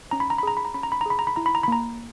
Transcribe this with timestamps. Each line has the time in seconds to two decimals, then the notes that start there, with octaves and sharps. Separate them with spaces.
0.11 C#4 A#5
0.20 B5
0.30 A#5
0.38 B5
0.43 G#4 A#5
0.57 B5
0.65 A#5
0.74 C#4 B5
0.83 A#5
0.92 B5
1.01 A#5
1.06 G#4 B5
1.19 A#5
1.27 B5
1.36 E4 A#5
1.46 B5
1.55 A#5
1.63 B5
1.68 A#3 A#5